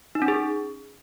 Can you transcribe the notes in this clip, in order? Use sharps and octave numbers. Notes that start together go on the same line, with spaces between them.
D#4
C#4
G#4